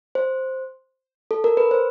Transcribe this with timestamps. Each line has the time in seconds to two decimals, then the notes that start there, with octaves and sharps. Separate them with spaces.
0.15 C5
1.31 A4
1.44 A#4
1.57 B4
1.71 C5